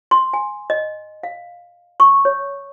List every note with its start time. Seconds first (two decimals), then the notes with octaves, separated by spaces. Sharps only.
0.11 C6
0.33 G#5
0.70 D#5
1.23 F5
2.00 C#6
2.25 C#5